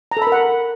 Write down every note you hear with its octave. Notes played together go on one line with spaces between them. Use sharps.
A#5
A4
B5
A#4
F#5